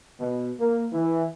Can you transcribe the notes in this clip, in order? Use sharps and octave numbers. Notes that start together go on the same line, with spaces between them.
B2
A#3
E3